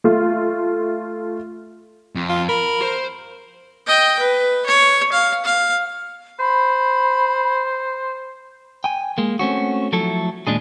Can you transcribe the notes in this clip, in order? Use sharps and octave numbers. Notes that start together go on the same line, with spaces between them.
A3 F4
F2
F4
A#4 B5
C5
D#5 G5
B4
C#5
F5
F5
C5 B5
G5 G#5
G#3 A#3
A3 C4 C#4 F#4
F3 F#3 A3 E4 A4
D#2 A#2 G#3 D4 G#4